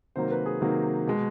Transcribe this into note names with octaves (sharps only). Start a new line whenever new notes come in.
C3 D#3 F#3 A#3 C5
B4
G#4
C3 D#3 F#3 A#3
B2 G#3